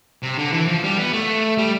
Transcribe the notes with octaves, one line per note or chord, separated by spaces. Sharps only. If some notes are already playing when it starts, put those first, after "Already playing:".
C3
D3
E3
F3
G3
B3
A3
G3